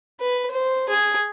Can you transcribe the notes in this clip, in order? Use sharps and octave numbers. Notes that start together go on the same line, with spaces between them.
B4
C5
G#4